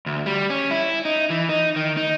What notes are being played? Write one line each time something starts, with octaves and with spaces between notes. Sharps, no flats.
D2
G3
C#4
E4
D#4
E3
D#4
D#3
D#4